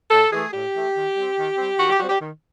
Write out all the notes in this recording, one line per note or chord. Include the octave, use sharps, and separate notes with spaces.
A2 A4
E3 A3 G#4
A2 G4
E3 A3
D#3
G3 C4
D#3
G3 C4
D#3 F#4
G4
G3 C4 F#4
G4
D#3